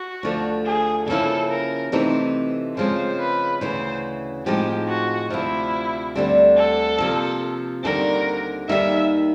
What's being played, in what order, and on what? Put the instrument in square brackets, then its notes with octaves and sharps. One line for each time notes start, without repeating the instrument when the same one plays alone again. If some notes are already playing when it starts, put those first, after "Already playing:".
Already playing: [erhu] F#4
[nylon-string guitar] D2 D3 F3 A3
[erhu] G#4
[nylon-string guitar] C#3 F3 A#3 C#4 E4 [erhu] A4
[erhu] A#4
[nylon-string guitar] C3 E3 A3 C4 D#4
[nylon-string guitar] C#3 F3 G#3 C4 [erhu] C5
[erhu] B4
[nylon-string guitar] D2 C#3 E3 [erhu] C5
[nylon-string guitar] A2 F3 G#3 C4 D#4 [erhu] G4
[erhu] F#4
[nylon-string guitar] D2 C3 F3 [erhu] E4
[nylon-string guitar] D2 D3 G3 C4
[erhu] A4
[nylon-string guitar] C3 F3 A#3
[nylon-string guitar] D#2 D3 G3 C4 [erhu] A#4
[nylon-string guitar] D#2 D#3 G3 A#3 D#4 [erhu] E5